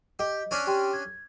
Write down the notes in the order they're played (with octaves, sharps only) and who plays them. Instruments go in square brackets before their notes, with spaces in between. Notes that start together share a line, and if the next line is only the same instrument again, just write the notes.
[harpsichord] G4 [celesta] D#5
[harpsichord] C#4 D4 C#5
[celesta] G4 G5 C6
G#6